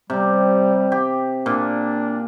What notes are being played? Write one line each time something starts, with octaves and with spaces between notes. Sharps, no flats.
C3 G3
G4
A#2 D4